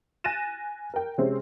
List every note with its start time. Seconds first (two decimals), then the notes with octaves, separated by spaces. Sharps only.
0.24 G#5 F#6 A6 A#6 D#7 E7
0.94 A#4 G5
1.18 C3 G#3 C4 C#4